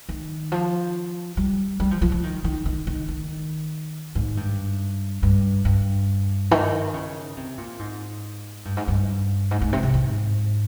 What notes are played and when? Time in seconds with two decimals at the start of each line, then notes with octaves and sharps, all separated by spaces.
0.09 D#3
0.52 F3
1.37 G3
1.80 G3
1.91 F3
2.02 F3
2.12 F3
2.23 D#3
2.44 D#3
2.65 D#3
2.87 D#3
3.08 D#3
4.15 G#2
4.37 G2
5.23 G2
5.65 G2
6.51 D#3
6.94 C#3
7.37 C3
7.58 A#2
7.79 G#2
8.65 G2
8.77 G#2
8.88 G2
9.51 G#2
9.61 G#2
9.73 C3
9.83 C3
9.94 G#2